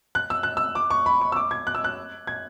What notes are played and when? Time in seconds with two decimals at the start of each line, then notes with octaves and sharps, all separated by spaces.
0.15 F#6
0.30 E6
0.43 F#6
0.57 E6
0.75 D6
0.90 C#6
1.06 B5
1.21 C#6
1.32 E6
1.36 D6
1.51 G#6
1.67 F#6
1.75 E6
1.84 F#6
2.27 G#6